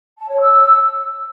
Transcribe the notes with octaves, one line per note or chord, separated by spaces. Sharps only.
A5
C#5
E6